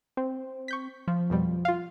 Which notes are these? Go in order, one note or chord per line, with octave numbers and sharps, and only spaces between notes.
C4
C#6 G6 B6
F3
F2 B2 G3
F4 F5